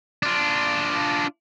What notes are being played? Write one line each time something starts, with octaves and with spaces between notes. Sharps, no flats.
D4 F4